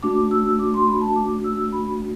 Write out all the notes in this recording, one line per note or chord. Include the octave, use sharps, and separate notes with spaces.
A3 D4 F#4 D6
E6
D6
C6
B5
A5
D6
E6
B5